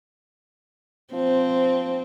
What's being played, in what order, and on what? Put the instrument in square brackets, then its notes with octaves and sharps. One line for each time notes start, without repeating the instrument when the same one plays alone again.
[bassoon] F3 [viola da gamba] C4